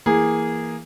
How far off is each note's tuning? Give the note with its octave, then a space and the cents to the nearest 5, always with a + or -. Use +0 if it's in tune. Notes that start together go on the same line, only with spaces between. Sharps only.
E3 +0 A#3 +0 G#4 -15